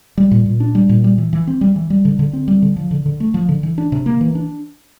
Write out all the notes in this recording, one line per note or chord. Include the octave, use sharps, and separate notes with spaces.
G3
A#2
A#2
D4
G3
A#2
G3
E3
E3
C4
G3
E3
G3
D3
D3
C4
G3
D3
F3
D3
D3
A3
F3
D3
E3
D4
C3
A#3
E3
D4